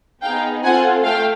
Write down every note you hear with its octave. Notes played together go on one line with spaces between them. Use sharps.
B3 D#4 G#4 F5 G5
C4 F4 A4 F#5 G#5
A3 F5 G5